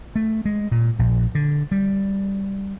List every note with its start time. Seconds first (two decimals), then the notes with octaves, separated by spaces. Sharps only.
0.16 A3
0.45 G#3
0.71 A#2
0.99 A#1
1.35 D3
1.72 G3